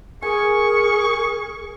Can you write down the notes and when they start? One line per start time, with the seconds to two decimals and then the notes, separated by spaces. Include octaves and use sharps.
0.22 G#4 A#4 G#5 C#6